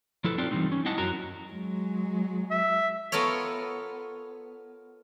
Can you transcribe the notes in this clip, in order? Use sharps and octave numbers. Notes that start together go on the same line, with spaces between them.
F3 E4 A4 B4
C4 D#4 F4 A4 B4 D5
E3 F3 G3 C4 D#4
C#4
C4 E4 D#5 F#5 A5
F#2 C#4 F#4 A#4 A#5
F#3 G#3
E5
B3 F4 A4 A#4 C#5